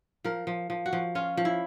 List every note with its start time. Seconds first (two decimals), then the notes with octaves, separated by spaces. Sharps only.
0.24 F3 A#4
0.47 F3
0.70 F3
0.86 F#4
0.93 F3
1.15 C#4 F4
1.37 F3
1.45 E4